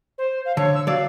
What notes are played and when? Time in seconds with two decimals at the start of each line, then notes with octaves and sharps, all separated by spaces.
0.18 C5
0.46 F5
0.57 D3 C#5
0.74 E6
0.87 F#3 D5 F5